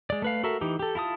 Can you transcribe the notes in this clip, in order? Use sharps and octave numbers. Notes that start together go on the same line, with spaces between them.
G#3 D5
A3 B4 F5
F#4 A4 A#4 E5
E3 D#4 G4
G4 A4
E4 F4 A5 D#6